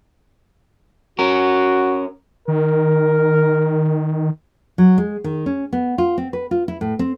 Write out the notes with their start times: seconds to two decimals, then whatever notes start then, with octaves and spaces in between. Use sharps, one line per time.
1.19 C#4 F#4 A#4
2.48 D#3 A#4
4.78 F#3
4.98 G#3
5.24 D#3
5.46 C#4
5.73 B3
5.98 F4
6.18 C4
6.33 B4
6.51 F4
6.68 E4
6.81 A2
6.99 C4